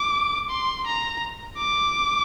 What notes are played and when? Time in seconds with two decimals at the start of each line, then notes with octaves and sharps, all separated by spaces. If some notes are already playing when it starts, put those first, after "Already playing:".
Already playing: D6
0.50 C6
0.87 A#5
1.58 D6